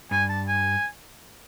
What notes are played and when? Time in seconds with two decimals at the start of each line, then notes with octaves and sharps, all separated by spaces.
0.11 G2 G#5
0.29 A5
0.48 G#5